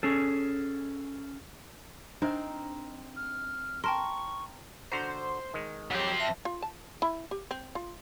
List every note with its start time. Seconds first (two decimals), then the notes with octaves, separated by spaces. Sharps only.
0.03 C#4 G#4 A4
2.22 C4 D4 D#4 A#4 C5 D#5
3.16 F6
3.84 A#4 G5 A5 C6 C#6
4.92 D3 F#4 C5 A#5
5.54 D#3 G#3
5.91 F2 F#3 C4 G4
6.20 E5 A5 A#6
6.45 F4
6.62 A5
7.02 E4
7.31 G4
7.51 C4
7.75 F4